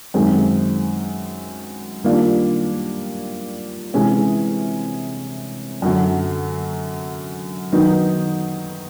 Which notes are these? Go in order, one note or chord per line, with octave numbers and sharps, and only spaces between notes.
F#2 D#3 G#3 C4
D#3 G3 A#3 D4 F4
C3 E3 G#3 C#4
F#2 D3 F#3
D#3 F#3 B3 D#4